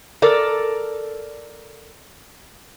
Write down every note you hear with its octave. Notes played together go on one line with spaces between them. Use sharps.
A4 A#4 D5